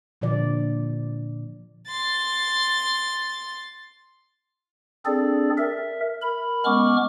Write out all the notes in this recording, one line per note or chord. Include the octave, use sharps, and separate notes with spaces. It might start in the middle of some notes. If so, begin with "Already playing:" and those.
A#2 D3 F3 D5
C6 A6
C4 D4 G#4 A4 D5
A#4 E5
A#4 B5
G#3 B3 C#4 C#6 D6 F6